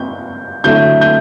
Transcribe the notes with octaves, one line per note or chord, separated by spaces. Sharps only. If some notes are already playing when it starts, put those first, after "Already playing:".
Already playing: G6
D3 F#3 A3 E4 G6
G6